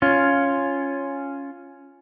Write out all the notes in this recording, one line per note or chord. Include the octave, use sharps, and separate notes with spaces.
C#4 F4